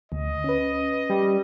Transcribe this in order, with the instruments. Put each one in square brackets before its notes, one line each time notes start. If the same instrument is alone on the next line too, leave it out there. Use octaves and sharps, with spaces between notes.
[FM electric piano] D2 [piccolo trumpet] D#5
[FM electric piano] C#4 B4
[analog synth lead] G3